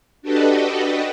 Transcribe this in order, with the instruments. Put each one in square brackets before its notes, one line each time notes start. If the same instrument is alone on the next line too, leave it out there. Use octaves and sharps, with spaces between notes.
[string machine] D4 F#4 G4 A4 B4 D#5